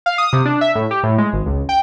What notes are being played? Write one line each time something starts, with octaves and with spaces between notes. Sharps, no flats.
F5
D#6
C3
D4
E5
A2
G4
A2
G#3
G#1
C#2
G5